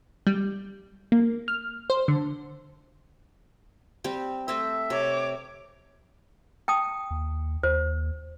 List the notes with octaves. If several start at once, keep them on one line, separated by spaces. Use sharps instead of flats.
G3
A#3
F6
C5
D3
G3 C4 G4
A3 C4 C5 E5
C3 C#5 D6
G5 A5 D#6
D#2
D#2 C5